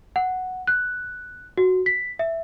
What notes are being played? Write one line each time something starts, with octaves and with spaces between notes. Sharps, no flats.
F#5
F#6
F#4
B6
E5